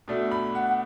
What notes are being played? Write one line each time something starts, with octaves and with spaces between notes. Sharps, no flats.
B2 A3 D4
B5
F#5